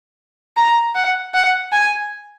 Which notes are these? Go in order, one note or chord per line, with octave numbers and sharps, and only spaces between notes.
A#5
F#5
F#5
G#5